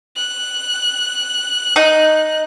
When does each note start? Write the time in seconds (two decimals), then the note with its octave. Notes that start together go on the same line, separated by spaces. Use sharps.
0.16 F#6
1.76 D#4